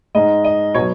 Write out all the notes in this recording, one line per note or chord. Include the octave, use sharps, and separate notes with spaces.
G#2 G#3 D#5
D#5
B2 F#3 C#5